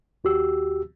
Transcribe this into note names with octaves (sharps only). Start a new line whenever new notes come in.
D#2 F#4 G4 E6